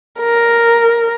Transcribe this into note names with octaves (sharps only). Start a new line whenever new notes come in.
A#4